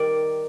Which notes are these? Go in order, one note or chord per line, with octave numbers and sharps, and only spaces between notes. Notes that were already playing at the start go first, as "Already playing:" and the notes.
Already playing: D#3 G3 A#4 D5